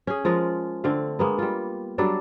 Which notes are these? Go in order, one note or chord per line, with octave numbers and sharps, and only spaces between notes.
C#4 G#4
F3 G#3 F4 A#4
D3 A3 C4 F5
G#3 A#3 B3
G3 F4
F#3 G3 D4 A4